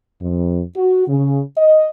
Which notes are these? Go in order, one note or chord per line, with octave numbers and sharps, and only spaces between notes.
F2
F#4
C#3
D#5